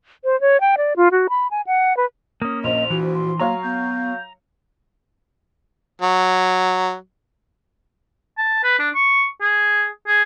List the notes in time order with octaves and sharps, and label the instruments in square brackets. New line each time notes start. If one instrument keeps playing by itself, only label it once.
[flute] C5
C#5
G5
D5
F4
F#4
B5
G#5
F#5
B4
[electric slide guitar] A#3 C#4 [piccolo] D#6
[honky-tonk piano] A#1 C5 [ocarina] D#5 [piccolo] F7
[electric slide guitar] E3 [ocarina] F#4
[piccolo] C6
[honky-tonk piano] F#3 C#5 F5 [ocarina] A#3 [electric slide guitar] A#5
[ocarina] B3 [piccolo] G6
[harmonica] F#3
[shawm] A5
B4
D4
C#6
G#4
G#4